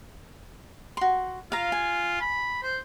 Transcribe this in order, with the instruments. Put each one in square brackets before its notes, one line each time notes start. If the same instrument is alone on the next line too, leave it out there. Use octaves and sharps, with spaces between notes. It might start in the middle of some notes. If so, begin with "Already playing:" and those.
[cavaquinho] F#4 C6
[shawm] F4 [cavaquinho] F5 A#5
[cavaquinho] G#5
[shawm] B5
C5